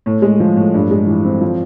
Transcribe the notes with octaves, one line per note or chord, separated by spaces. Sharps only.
A2
G#3
F3
A2
G2
G#3
E3
C4
F3